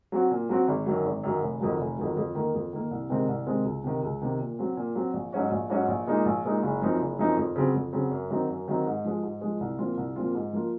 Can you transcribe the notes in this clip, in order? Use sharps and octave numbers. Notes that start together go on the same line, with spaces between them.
F#3 C4 F#4
A#2
F#3 C4 F#4
G#1
F#2 D#3 F#3
G#1
F#2 D#3 F#3
F1
F2 D#3 F#3
F1
F2 D#3 F#3
F2
D#3 A#3
F2
D#3 A#3
C2
C3 D#3 G#3 C4
C2
C3 D#3 G#3 C4
C#2
C3 D#3
C#2
C3 D#3
A#2
F#3 C4
A#2
F#3 C4
A#1
G#2 F#3 C#4 F#4
A#1
G#2 F#3 C#4 F#4
A#1
A#2 G#3 D#4
A#1
A#2 G#3 D#4
F#1
F#2 F3 C4 D#4
F#1
F#2 F3 C4 D#4
F2
C#3 F#3 C4
F2
C#3 F#3 C4
F#2
D#3 F#3 C4 D#4
F#2
D#3 F#3 C4 D#4
G#2
F3 G#3
G#2
F3 G#3
C2
A#2 F3 C4 F4
C2
A#2 F3 C4 F4
G#2
F3 A#3 F4